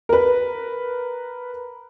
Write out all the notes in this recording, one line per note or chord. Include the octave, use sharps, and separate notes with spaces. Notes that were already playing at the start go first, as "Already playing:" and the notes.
A#4 B4